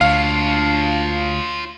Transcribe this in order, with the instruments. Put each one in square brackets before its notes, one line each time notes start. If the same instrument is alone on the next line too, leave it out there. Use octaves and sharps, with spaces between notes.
[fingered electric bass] D2 [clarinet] D4 [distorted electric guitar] F4 C#5 [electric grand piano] F5